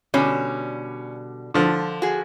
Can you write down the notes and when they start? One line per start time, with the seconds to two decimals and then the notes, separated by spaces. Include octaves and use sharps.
0.14 B2 D3 G3 C#4
1.54 D3 F3
2.02 F#4 G#4